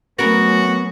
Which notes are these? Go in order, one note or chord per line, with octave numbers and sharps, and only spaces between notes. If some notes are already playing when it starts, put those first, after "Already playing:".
F#3 A3 B3 C#4 F#4 A#4